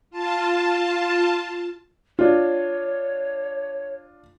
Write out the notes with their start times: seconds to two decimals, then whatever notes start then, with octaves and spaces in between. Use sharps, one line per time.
0.10 F4 A5
2.19 D4 F4 C#5